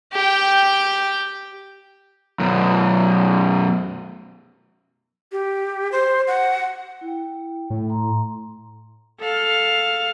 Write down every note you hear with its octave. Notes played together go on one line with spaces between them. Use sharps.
G4 G5
F#2 B2
G4
C5
F#5
E4 G5
A2
A#5 C6
A4 F5